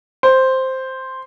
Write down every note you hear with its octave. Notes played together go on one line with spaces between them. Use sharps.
C5